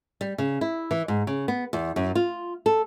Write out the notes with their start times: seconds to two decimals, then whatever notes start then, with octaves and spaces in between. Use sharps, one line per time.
0.21 G3
0.38 C#3
0.61 E4
0.91 E3
1.08 G#2
1.27 C#3
1.48 B3
1.73 E2
1.96 F#2
2.15 F4
2.66 A4